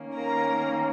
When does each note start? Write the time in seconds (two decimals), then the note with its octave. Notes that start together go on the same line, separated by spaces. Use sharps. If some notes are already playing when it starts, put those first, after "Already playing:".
Already playing: D#3 A#3 C#4
0.16 A#4 A#5